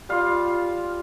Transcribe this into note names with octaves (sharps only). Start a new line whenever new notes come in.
G3 F4 F5